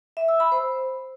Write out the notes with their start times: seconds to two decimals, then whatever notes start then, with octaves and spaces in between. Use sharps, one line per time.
0.17 E5
0.28 E6
0.40 B5
0.52 C5